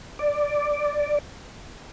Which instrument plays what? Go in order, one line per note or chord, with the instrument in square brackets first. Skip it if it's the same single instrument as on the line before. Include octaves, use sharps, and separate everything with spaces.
[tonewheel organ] D5